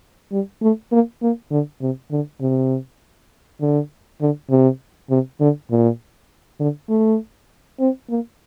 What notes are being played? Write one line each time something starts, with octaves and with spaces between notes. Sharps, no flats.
G3
A3
A#3
A#3
D3
C3
D3
C3
D3
D3
C3
C3
D3
A#2
D3
A3
C4
A#3